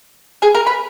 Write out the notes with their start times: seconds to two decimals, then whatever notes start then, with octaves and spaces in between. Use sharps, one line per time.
0.42 G#4 G#5
0.55 A#4 A#5
0.67 B4 B5